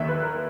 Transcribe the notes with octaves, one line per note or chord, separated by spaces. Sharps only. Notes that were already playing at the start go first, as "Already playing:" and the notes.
Already playing: D#2 D#3 A#3 E5
B4
A#4